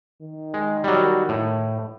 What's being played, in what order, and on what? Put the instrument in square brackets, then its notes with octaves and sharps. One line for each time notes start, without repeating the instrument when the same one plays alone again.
[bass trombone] D#3
[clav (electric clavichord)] G#3
F#3 G3
A2